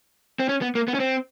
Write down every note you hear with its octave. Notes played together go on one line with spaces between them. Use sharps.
C4
C#4
B3
A#3
B3
C#4
C4